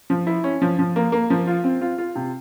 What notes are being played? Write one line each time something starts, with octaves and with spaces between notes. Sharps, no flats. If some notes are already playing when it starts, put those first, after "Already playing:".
F3
E4
C#4
F3
F3
A#3
A#3
F3
F4
C4
F4
F4
C3